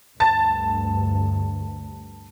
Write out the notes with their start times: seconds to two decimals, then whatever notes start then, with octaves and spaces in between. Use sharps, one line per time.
0.20 D2 G2 A5 A6